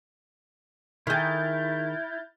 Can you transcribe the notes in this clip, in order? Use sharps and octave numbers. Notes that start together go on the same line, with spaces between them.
D#3 E4 G#4 F6 G6 A6